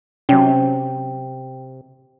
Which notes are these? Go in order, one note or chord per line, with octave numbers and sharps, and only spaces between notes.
C3 F#3 C#4 G5